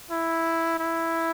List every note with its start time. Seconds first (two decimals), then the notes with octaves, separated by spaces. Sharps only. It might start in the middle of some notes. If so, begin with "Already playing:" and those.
0.11 E4
0.79 E4